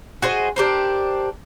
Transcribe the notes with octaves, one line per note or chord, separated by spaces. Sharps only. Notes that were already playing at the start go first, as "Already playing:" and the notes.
F#4 G#4 C5 D#5
D4 G4 A#4 C5